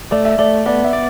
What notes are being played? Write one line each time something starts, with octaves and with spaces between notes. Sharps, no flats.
A3 D5
E5
A3 D5
B3 D5
E5
D5